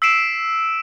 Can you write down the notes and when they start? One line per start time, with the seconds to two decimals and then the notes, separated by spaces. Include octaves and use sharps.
0.02 E6 B6 C7 D7 E7